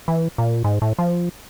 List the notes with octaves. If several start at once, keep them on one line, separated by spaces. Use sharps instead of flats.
E3
A#2
G#2
A2
F3